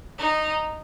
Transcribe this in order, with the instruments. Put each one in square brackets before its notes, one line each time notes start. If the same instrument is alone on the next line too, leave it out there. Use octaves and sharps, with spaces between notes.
[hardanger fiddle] D#4